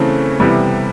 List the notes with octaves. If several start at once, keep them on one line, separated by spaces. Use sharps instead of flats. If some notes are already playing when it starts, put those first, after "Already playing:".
Already playing: C#3 E3 A3 C4 A4
C3 E3 G3 B3